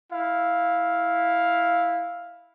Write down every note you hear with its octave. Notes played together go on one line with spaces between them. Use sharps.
E4 F5